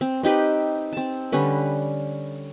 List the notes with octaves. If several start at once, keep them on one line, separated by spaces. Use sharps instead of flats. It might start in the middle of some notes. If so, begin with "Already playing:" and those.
C4
C4 D#4 G4 B4
C4 A5
D3 G3 C#4 B4